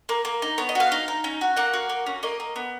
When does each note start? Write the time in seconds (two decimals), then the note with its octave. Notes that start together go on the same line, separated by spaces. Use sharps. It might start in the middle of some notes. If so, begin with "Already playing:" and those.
0.09 A#3
0.25 A#3
0.42 D#4
0.58 B3 C#5
0.69 D#5
0.75 F#4 F5
0.92 D#4
1.08 D#4
1.24 C#4
1.41 F#4
1.56 A#3 F#5
1.74 F#4
1.89 A#3
2.06 C#4
2.23 A#3 D#5
2.40 A#3
2.56 B3